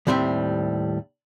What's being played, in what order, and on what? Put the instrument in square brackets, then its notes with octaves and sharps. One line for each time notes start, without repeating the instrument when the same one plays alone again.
[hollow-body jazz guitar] D#2 A2 G3 C4 E5 G5